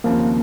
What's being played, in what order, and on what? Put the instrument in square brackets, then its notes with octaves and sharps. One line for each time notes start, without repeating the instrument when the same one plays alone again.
[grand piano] D#2 C#3 F3 C4 [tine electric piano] A#3